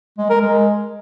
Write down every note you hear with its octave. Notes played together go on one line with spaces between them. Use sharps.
G#3
A#4
G#3